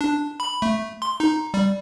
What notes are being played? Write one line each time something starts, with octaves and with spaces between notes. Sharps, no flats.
D4
B5
A3
C6
D#4
G3